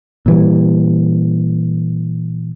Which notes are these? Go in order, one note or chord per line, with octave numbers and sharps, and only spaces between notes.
A#2 E3 G3